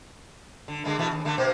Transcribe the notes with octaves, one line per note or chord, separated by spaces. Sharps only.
D3
D3 G#3 A#3
B2 E3 A3
D#2
D3 A3 A#3
B2 A#3 C5